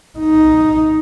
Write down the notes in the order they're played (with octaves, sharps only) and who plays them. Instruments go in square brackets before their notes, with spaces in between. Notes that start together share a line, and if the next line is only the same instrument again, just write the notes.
[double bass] D#4